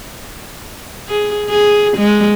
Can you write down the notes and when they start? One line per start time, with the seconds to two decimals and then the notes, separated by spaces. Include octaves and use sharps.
1.09 G#4
1.50 G#4
1.97 G#3